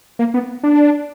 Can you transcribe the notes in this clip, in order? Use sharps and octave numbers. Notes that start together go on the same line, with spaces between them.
A#3
B3
D4